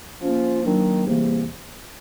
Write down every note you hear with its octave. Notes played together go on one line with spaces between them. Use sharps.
F3 A#3 C#4 F4
D#3 F#3 A#3 D4
E2 C3 E3 G3 A#3